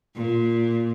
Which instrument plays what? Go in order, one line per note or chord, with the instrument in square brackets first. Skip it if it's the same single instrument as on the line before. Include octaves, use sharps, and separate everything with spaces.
[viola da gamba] A#2